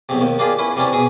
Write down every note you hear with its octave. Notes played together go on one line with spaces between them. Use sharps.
B1 E2 C3
D#2 D#3
A#3 D4 F4 G4 G#4
C#4 E4 B4
C3 E3 C#4 D4
B2 G#4 G#5 D#6